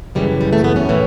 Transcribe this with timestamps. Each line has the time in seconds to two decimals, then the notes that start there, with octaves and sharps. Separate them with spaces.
0.15 F#2 C#3 E3 G3
0.41 G3
0.53 A3
0.64 B3
0.76 C#4
0.89 A2 E3